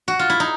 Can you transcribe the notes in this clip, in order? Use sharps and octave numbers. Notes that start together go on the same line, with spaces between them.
F#4
F4
E4
D#4